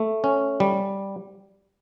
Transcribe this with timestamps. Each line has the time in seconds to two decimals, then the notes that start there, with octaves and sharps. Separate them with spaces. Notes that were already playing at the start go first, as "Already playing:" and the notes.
Already playing: A3
0.24 C#4
0.60 G3